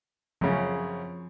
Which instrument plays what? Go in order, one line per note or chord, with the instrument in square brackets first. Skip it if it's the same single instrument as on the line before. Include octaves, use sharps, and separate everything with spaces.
[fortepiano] F#2 C#3 [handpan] F3